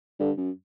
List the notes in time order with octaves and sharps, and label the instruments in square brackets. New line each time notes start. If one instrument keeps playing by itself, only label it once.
[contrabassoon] G2 [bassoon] D3
[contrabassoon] F#2